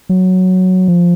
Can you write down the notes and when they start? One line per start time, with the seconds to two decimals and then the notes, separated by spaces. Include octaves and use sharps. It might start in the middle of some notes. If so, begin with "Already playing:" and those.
0.09 F#3
0.88 F3